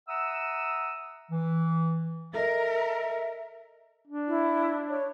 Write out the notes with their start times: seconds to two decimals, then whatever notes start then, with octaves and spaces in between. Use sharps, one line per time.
0.08 E5 F#5 A#5 D#6 E6
1.31 E3
2.34 A4 A#4 D#5 E5
4.07 D4
4.27 E4
4.88 C#5